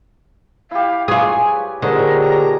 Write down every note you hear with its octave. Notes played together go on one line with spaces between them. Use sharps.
E4 G4 F5
F4 G#4 B4 C#5 D5 G#5
A#2 D3 D#4 G4 G#4 A#4 C5 C#5
A#5